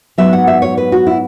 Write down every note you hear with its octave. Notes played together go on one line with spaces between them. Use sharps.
G#2 F#3 B3 E5
F#5
E5
C#5
B4
F#4
E4